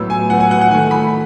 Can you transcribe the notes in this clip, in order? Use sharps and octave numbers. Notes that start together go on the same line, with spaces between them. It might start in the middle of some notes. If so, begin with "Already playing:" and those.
Already playing: A2 F#3 B3 E6
G#5
A2 F#3 B3 F#5
G#5
F#5
F#5
D#3 A3 G#5
B5